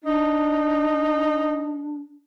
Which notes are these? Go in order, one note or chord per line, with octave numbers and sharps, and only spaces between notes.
D4 D#4